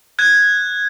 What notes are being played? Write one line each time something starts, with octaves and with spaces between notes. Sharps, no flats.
F#6 G#6